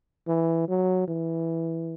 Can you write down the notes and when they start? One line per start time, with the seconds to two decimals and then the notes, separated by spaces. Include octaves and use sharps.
0.27 E3
0.68 F#3
1.08 E3